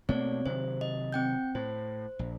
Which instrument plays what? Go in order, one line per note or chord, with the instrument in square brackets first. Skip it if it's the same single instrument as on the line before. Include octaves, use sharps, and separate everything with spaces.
[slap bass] B2 A3 A#3 [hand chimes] C4 C#5 D5
[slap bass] C3 D#3 F#3 [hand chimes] C5
[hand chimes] D#5
C4 G5 G6
[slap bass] A2 [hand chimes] C5
[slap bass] A#1